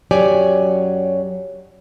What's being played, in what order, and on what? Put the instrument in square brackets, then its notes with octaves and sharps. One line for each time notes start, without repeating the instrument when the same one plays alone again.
[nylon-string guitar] F#2 F#3 G4 C#5 D5 G#5